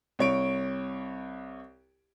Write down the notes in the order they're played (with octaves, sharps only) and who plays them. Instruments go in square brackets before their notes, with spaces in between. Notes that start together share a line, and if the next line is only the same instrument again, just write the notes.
[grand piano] C2 C#5 D7